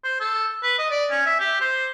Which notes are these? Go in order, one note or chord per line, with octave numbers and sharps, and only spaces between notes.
C5
A4
B4
D#5
D5
C#4
E5
G4
C5